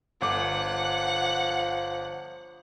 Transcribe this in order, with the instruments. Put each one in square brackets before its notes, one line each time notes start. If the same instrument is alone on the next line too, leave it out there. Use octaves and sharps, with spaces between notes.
[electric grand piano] G1 D6 [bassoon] F3 [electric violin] F#5